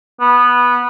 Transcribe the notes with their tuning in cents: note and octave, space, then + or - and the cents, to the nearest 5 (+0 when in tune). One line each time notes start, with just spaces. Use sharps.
B3 -10